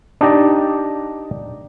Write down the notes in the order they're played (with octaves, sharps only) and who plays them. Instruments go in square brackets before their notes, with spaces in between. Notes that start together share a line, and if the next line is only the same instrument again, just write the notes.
[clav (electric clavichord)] D4 D#4 G4 D5 D#5